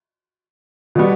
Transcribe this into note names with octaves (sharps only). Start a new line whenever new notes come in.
B2 G3 B3